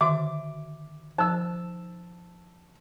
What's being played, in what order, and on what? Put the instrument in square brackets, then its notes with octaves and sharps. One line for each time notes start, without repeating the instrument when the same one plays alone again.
[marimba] D3 D#3 [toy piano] F#4 E5 [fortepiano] D6
[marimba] F3 [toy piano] D#4 C5 [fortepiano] A5 E6